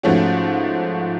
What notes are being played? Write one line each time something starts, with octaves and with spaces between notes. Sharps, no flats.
G#2 F3 A3 C#4 F#4